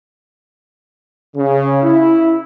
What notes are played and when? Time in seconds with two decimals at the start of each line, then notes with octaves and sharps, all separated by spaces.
1.36 C#3
1.83 E4